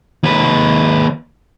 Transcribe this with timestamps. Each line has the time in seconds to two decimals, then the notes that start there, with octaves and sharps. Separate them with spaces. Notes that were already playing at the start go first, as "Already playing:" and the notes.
0.23 D#2 B4